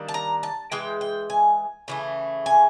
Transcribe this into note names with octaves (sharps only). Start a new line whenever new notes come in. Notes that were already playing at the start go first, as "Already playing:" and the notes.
Already playing: D#3 G3 A#3 D4
A5
A#5
A5
E3 G#3 G5
G5
G#5
C#3 E3 A3
G#5